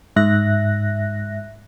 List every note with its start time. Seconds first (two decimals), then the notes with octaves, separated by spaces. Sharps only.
0.16 G#2 E5 F#6 A#6